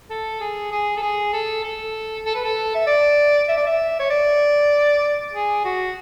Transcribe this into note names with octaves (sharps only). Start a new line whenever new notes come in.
A4
G#4
G#4
A4
G#4
A4
A4
A4
B4
A4
E5
D5
E5
D5
E5
C#5
D5
G#4
F#4